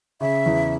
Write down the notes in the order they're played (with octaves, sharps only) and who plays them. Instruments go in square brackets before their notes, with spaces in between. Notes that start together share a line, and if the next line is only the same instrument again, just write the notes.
[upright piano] C#3 [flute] E5
[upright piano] E2